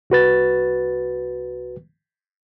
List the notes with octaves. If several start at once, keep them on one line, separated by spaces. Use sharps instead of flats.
C2 F#4 B4 A6